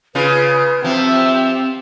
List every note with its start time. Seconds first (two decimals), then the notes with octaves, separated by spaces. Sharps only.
0.15 C#3 F4 B4
0.84 F3 C4 G4 E5